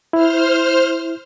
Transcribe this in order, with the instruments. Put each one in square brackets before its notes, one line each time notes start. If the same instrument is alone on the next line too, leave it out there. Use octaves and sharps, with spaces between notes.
[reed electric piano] E4 [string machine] C5 F6